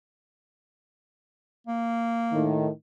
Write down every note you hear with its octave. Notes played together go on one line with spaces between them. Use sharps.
A#3
A2 D#3